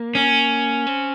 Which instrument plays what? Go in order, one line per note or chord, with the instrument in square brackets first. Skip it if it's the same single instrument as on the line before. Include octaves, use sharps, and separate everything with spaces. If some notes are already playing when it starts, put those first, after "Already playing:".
Already playing: [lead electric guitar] A#3
[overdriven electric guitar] C#4
[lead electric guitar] C4